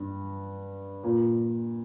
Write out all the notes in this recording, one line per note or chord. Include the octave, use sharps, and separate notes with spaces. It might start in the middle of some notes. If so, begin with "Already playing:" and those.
Already playing: G2
A#2